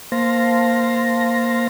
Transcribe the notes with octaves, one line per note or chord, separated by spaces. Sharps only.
A#3 C5 F5 A5 C6 A#6